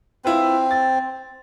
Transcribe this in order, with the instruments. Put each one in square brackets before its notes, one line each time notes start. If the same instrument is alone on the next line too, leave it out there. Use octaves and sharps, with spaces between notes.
[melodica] C4 [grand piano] E4 F4 B4
[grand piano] A6